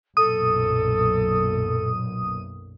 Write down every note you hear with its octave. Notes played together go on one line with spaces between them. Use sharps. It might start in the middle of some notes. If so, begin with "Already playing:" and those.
B1 F#2 A#2 A4 D#6